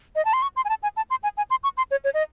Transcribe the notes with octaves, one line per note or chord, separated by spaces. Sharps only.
D#5
A5
C6
C#6
C6
G#5
A5
G#5
A5
C6
G#5
G#5
C6
C#6
C6
C#5
C#5
D#5